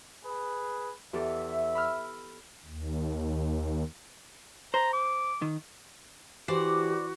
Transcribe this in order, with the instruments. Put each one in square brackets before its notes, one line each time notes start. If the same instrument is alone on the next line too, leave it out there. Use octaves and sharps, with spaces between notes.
[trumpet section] G#4 B4
[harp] E2 G4 A4 [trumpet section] E5
[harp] B5 E6 F6
[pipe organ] D#2
[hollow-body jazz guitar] C5 [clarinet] A#5
[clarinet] D6
[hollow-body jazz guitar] D#3
[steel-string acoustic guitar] E3 [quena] F#4 [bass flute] G4 [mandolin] C5 D5